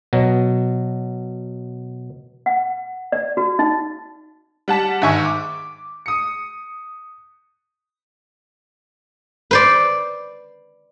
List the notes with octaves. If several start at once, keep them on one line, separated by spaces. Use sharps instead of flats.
B2 F#3
F#5
D5
F#4
D#4
G3 F#5 A5 B6
G#2 D#3 E5 G#5 C#6
D6
D#6 C#7
B4 C5 D5